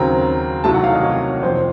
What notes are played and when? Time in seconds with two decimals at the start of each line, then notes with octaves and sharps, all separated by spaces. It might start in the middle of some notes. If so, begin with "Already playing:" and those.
Already playing: D#2 C#3 F#3 C4 A#5
0.64 C2 C3 D#3 F#3 A3 A5
0.74 F#5
0.84 F5
0.94 D#5
1.03 C#5
1.42 F2 C3 F3 C4 C5